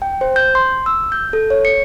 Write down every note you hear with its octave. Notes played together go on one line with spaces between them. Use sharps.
G5
C5
G6
C6
E6
G6
A4
C#5
C#7